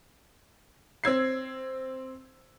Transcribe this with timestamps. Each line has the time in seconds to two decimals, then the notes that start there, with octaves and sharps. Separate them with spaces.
1.04 C4 E6 G#6 C7